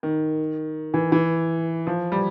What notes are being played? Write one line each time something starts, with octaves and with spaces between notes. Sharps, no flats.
D#3
E3
E3
F3
G3